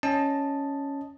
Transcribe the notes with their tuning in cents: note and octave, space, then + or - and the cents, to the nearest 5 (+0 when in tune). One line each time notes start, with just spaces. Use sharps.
C#4 +0 D#5 +0 A5 +0